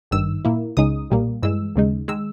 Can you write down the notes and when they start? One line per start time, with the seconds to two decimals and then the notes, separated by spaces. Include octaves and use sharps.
0.11 G#1 G2 D#3 E6
0.45 A#2 A#3 E4
0.77 C#2 C#3 G#3 D#4 D#6
1.10 B1 A#2 G3 A#3
1.43 G2 E3 G#3 E6
1.76 D#2 C#3 G#3 D#4
2.08 D#3 G#3 E6